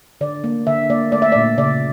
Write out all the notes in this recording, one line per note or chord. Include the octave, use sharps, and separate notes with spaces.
D3 D5
A#3
D3 E5
A#3 D5
A3 D5
E5
A#2 D5
C#3 D5